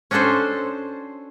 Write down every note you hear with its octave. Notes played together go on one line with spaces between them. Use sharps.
C#4 D4 F#4 A4 C5